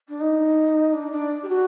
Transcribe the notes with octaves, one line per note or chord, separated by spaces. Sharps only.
D4
D#4
D4
D4
G4
F#4